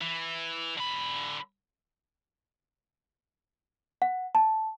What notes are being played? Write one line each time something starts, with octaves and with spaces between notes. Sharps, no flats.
E3
D3 B5
F#5
A5